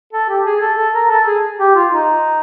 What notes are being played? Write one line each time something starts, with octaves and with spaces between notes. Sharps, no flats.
A4
G4
G#4
A4
A4
A#4
A4
G#4
G4
F4
D#4